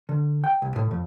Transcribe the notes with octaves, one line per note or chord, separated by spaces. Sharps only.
D3
G5
C2
A2
F2